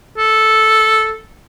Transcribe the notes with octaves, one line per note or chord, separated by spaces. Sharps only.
A4